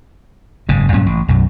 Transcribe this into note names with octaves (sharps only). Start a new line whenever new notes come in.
F#1 G#2 C#3
G2 A#2 F#3 C#4
A1
B1 F#2